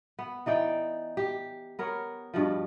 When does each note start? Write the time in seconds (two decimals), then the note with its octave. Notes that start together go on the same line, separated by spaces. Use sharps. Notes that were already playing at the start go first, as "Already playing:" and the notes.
0.19 B3
0.46 E3 D#4 D5 G5
1.17 G4
1.79 B3 A#4 C#5
2.34 G2 B2 F3